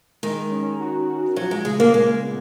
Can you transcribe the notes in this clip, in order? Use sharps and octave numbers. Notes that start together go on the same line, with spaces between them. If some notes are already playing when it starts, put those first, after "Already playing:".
D#3 G#3
C#4
F#4
F#4
F3 F#3
G#3
C#3 G#3
A#3
A#2 G#3
B3